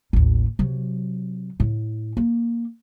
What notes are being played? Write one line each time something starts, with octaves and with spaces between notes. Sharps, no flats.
A1 D#2
C3 F#3
A2
A#3